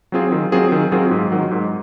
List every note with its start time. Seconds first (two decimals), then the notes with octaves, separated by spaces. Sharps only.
0.12 F#3 C4 F4 G#4
0.32 D#3
0.52 F#3 C4 F4 G#4
0.72 D#3
0.92 F#3 C4 F4 G#4
1.11 G#2
1.32 D#3 F#3
1.51 G#2